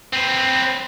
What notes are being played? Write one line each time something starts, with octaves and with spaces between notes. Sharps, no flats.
C4 B4